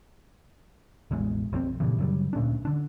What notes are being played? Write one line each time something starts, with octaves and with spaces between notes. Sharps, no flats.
E1 A1 E2 G#3
B1 F2 E3 C4
G2 A#2 C#3 E3
F#2 C#3 F#3 G3
D2 A#2 C#4 D4
D3 D4